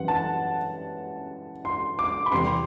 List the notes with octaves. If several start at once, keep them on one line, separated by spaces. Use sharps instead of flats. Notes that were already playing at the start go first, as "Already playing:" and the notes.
Already playing: F#2 E3 G3 F#5
A5
C6
D6
B5
E2 C3 G3 C4 C6